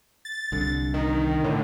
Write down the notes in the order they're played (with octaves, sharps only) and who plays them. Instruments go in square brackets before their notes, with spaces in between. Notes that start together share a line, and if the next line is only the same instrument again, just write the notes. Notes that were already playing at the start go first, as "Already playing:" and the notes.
[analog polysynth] A6
[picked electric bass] C2 D3
[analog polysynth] D#3
A2 D3